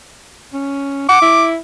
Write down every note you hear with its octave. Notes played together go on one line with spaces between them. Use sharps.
C#4
F#5 D6
E4